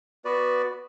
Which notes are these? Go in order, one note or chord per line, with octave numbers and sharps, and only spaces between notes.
B3 F#4 B4 D5